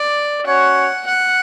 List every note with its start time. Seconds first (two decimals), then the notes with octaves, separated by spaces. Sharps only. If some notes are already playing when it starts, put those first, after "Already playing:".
Already playing: D5
0.46 C#4 F#4 C#5 F#5
1.07 F#5